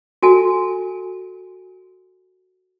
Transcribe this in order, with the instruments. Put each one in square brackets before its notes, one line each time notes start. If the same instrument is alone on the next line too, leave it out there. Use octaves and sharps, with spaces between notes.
[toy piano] F#4 A4 G#5